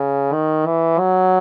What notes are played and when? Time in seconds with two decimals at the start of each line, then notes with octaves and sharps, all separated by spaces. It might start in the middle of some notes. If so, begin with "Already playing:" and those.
Already playing: C#3
0.33 D#3
0.66 E3
0.99 F#3